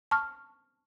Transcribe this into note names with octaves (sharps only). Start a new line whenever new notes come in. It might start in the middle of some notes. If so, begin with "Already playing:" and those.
A5 C#6 F6